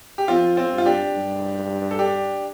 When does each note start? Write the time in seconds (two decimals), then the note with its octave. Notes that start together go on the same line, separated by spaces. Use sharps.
0.18 G4
0.28 F2 C4 F4
0.57 C4 F4
0.71 G2
0.78 F4
0.86 D4 G4
1.14 G2
1.91 A4
1.99 D4 G4